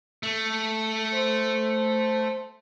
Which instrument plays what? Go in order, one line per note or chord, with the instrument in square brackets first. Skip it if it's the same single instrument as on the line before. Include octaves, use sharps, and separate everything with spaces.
[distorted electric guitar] A3
[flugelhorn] C5